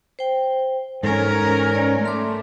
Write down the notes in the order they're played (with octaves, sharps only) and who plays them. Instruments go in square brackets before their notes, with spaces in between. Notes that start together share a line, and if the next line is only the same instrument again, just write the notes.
[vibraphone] C5 G5
[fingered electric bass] G#2 [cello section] C#4 A#4 [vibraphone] A4 C#5
[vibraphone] C#5 D5
[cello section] A3 [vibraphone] C#4 C6 D6